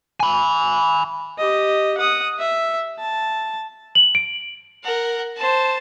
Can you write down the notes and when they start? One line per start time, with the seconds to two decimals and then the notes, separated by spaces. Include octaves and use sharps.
0.20 G#5 B5
1.38 G4 D#5
1.97 F#5 D#6
2.39 E5
2.99 A5
3.95 F#7
4.15 D7
4.84 A#4 F#5
5.37 C5 A5